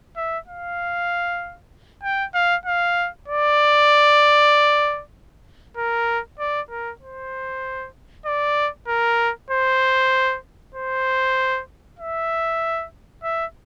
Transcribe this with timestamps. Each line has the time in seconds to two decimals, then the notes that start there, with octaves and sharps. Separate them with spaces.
0.16 E5
0.48 F5
2.03 G5
2.34 F5
2.65 F5
3.28 D5
5.77 A#4
6.39 D5
6.70 A#4
7.01 C5
8.26 D5
8.88 A#4
9.50 C5
10.75 C5
11.99 E5
13.23 E5